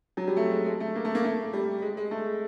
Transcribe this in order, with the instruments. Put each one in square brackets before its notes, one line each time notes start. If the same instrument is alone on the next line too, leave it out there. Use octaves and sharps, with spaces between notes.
[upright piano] F#3
G3
A3
G#3
G#3
A3
A#3
A3
A#3
A3
G3
G#3
G#3
A3